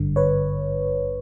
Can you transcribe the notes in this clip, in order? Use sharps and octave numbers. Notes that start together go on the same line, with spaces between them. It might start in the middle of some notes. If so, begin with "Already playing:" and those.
Already playing: G#1 G2 D3
B4 C#5